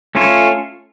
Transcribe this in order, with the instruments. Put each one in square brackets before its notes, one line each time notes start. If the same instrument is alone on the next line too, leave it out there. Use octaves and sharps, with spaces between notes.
[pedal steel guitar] A3 C#4 F4 A4 C#5